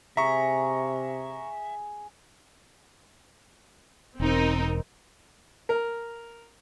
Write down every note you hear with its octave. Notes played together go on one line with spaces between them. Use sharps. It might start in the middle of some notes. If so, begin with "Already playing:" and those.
C3 G#4 E5 A#5 C#6
E1 C4 D#4 A#4
A#4